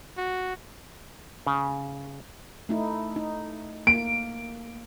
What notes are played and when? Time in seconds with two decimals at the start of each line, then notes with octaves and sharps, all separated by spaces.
0.17 F#4
1.47 C#3
2.69 A3 D#4 E4
3.16 D#4
3.87 A#3 D7